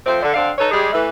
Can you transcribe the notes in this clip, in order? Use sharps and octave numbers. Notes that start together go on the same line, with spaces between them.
F3 A3 C4
D3
D3 C4 D4 F5
D#4 A4 B4 C#5
G3 G#3 G4 G#4
E3 A3